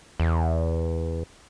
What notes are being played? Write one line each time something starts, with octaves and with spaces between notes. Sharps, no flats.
E2